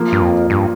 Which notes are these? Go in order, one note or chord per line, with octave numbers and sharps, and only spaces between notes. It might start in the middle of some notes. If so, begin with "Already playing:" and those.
Already playing: F3 A#3 F4
G2
F2
G2